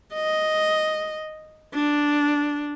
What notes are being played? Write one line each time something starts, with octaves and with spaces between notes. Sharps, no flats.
D#5
D4